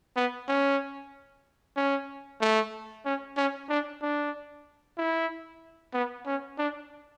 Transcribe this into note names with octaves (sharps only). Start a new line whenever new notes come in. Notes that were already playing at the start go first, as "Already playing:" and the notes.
B3
C#4
C#4
A3
C#4
C#4
D4
D4
E4
B3
C#4
D4